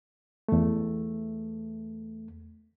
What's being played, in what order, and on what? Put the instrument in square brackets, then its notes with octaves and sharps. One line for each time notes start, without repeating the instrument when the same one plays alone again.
[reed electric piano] E2 A3